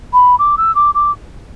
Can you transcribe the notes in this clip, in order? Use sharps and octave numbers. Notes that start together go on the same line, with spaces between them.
B5
D6
E6
D6
D6